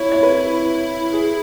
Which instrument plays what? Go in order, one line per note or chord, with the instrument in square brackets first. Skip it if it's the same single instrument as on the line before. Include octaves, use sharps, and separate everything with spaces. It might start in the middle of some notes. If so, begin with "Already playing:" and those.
Already playing: [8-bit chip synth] E4 [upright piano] C#5
[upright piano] C#5
B4
G#4